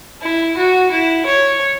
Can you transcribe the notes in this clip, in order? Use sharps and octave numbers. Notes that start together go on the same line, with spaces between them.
E4
F#4
E4
C#5